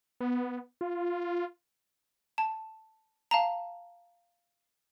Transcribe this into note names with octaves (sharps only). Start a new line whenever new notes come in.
B3
F4
A5
F5 A5 A#5